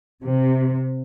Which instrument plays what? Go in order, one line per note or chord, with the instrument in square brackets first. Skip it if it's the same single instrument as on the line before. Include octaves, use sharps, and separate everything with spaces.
[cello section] C3